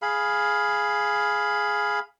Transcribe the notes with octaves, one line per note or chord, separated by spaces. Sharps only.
G#4 F5 B5